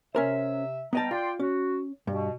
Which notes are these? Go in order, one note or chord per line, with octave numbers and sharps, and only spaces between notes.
C3 C#4 A#4 C5 E5
G3 B3 D#5 G5 A5 A#5
F4 D5 G5 C6
C#4 F#4
G2 B2